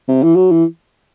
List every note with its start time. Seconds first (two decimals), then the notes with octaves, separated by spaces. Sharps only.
0.09 C3
0.23 E3
0.36 F#3
0.52 E3